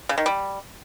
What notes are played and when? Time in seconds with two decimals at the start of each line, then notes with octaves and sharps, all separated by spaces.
0.09 C#3
0.18 D#3
0.26 G3